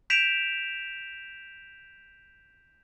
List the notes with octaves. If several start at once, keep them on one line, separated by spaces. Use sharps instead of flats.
G6 B6 D7 E7 F7